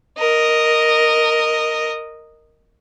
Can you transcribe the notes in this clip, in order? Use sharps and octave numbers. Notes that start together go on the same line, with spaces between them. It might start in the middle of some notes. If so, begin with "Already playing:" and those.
A#4 D#5